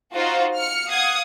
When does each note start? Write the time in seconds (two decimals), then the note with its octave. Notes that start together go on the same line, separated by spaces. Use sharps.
0.15 D#4 F4 F#4 C5
0.56 F6 C#7
0.89 F5 F#5 D#6 G#6